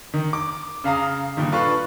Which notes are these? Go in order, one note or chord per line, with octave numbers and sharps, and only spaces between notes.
D#3
D6
C#3 F5 A#5 D#6
G2 A#2 D#3
D4 F4 A4 B4 A5 C#6